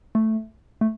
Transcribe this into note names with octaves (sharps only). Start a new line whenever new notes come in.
A3
A3